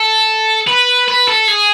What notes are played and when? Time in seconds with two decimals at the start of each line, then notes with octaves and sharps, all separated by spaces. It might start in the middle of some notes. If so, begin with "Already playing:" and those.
Already playing: A4
0.67 B4
1.08 B4
1.28 A4
1.48 G#4